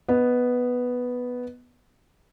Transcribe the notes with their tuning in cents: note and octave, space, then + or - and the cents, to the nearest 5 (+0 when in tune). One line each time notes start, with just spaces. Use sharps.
B3 +0 D#5 +0